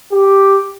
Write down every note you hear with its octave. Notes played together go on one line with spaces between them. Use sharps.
G4